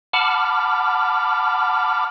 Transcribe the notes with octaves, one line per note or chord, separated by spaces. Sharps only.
F#5 A5 B5 D6 F6